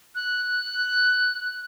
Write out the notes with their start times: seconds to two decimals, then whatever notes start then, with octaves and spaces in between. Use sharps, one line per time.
0.15 F#6